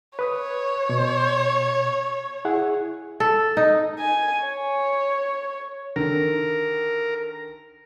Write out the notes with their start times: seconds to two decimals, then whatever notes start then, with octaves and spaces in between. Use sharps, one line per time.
0.19 B4 C#5 D#6
0.89 B2
2.45 E4 G#4 F#5
3.20 A4
3.57 D#4
3.98 G#5
4.45 C#5
5.96 D3 D#3 A#4